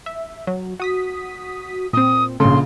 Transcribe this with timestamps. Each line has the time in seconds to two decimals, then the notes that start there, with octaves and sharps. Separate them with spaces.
0.06 E5
0.47 F#3
0.80 F#4 D#6 B6
1.93 A#2 C4 D#6
2.40 A#1 C#3 A4 C6